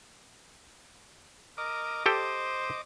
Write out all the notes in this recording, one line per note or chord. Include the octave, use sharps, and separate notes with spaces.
A#4 D#5 D6
G4 A4 C5 G5